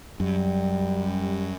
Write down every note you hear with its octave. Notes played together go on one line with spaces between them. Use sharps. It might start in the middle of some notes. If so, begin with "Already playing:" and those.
F#2 G3